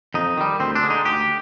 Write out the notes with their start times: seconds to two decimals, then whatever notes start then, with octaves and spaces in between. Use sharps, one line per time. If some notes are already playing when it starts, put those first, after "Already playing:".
0.14 F2 D#4
0.37 D#3 G3
0.60 D2 C4
0.75 D4
0.82 D3 G#3
0.90 D#4
1.05 D2 G4